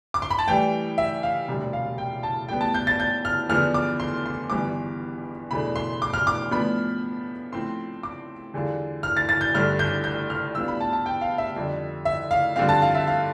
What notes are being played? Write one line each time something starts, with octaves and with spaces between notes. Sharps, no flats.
D6
C6
B5
A5
A2 E3 G3 G5
E5
F5
E1 D2 C3 G3 D4
F5
G5
A5
A2 G3 B3 G5
A5
G6
A6
G6
F6
E2 D3 F3 B3 D4 F6
D6
C6
C6
G1 G2 E3 B3 D6
E1 E2 B2 A3 D4 B5
C6
D6
F6
D6
A2 F3 B3 D4 B5
A2 F3 C4 C6
D6
E2 D3 G3 D4 F4
F6
A6
A6
G6
G1 G2 D3 A3 F6
G6
G6
F6
A2 G3 B3 D4 F4 E6
B5
A5
A5
G5
F5
E5
F2 D3 G3
E5
F5
G2 D3 F3 C4 F5
A5
F5
E5
F5